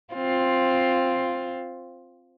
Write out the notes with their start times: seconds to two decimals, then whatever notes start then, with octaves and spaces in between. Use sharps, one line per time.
0.14 C4 F4